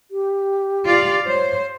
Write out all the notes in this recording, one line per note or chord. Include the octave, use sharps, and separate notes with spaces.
G4
F4 D5 F5
C5 C#5